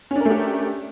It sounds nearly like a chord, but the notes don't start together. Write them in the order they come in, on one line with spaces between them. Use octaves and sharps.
C#4 D4 A#4 A3 G4